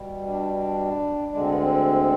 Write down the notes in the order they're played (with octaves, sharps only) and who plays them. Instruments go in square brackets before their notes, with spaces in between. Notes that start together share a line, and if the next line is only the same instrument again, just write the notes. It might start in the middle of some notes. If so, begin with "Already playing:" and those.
Already playing: [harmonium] B2 G3
D4
D4
D2 D3 G#3 D4
C4
B3
C4